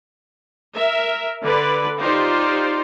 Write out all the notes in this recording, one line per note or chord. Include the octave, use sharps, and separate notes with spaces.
A#4 E5
D3 B4 D5
D#4 F4 G4 C5 D5